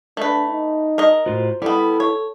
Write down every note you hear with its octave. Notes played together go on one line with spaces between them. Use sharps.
A3 D4 B4
D#4
A#4 D#5
A2 F4 F#4 C5
G3 B3 E4 A4
C#5